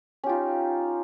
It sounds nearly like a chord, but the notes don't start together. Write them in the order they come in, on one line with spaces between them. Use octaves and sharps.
C#4 G4 F4 D#4